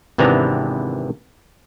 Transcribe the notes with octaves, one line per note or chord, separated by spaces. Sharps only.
G#1 C3 E3 B3 D4 A#5